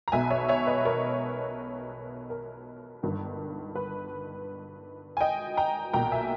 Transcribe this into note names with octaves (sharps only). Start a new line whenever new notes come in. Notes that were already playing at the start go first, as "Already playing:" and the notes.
A#5
B1 B2 E5 G#5
C#5 E5
C#5 E5
B4 D#5
A#4 C#5
A#4
G1 G2 D#3
B4
G#5
D#5 G5
G5 A#5
B1 A#2 G5 A#5
E5 G#5